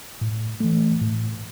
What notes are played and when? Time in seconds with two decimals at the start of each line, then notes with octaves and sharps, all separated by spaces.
0.21 A2
0.60 E3 A3
1.01 A2